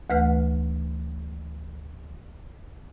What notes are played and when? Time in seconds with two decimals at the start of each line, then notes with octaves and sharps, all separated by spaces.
0.10 D2 E3 A3 B4 F#5 F6